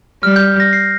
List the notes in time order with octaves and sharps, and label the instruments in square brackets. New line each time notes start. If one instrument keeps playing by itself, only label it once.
[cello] G3 [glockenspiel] F6
[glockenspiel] G6
A#6
C7